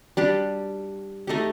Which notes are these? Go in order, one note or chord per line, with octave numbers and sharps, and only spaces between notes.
G3 D4 G4
A3 D#4 G4